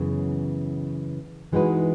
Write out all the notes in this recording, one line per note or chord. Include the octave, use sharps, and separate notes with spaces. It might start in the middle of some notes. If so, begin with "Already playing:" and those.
Already playing: F#2 C#3 E3 B3
E3 G#3 D#4 F#4 B4